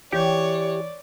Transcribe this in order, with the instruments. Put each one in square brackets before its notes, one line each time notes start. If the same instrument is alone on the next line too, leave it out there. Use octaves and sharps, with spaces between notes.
[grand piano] E3 [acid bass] G4 [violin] C#5 [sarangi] D5